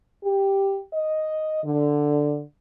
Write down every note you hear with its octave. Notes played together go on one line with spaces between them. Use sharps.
G4
D#5
D3